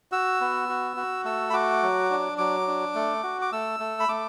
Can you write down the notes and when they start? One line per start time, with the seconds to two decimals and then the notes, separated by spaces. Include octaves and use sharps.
0.12 F#4 E6
0.41 B3
0.69 F#4
0.97 F#4
1.25 A3 E6
1.50 B5
1.53 F#4 D6
1.82 F#3
2.10 D4
2.38 F#3 D6
2.67 D4
2.95 A3
3.23 F#4
3.42 D6
3.52 A3 E6
3.80 A3
4.00 B5
4.08 A3 D6